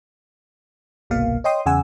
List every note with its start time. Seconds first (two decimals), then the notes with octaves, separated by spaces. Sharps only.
1.10 G1 C2 B2 A#3 F5
1.44 C#5 D#5 G5 C6 D#6
1.66 E2 C#3 F#5 G#5 E6